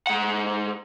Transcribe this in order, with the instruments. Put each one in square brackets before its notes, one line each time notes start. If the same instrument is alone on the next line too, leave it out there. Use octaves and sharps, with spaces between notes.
[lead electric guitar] G#2 F#5